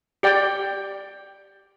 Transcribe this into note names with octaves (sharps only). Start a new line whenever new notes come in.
G4 D5 G5